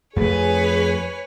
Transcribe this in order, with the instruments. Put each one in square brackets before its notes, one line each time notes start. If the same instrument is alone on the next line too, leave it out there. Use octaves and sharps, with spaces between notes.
[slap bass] F2 A3 [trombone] G#4 [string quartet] B4 C#5 G#5